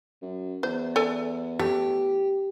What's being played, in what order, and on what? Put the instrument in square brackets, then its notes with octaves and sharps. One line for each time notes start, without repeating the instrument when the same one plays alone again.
[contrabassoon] F#2
[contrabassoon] E2 [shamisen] C5
[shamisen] A4 D5 G#5
[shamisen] A3 [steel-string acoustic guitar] G4